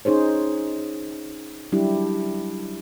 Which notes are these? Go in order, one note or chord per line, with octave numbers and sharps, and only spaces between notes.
C#4 D#4 G#4 C5 C#5
F#3 G3 D4 E4 G4